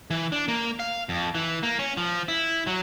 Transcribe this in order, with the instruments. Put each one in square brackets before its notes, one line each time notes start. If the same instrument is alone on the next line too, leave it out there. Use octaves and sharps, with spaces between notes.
[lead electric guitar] E3
D4
A#3
F5
F2
E3
A#3
C#4
F3
E4
F#3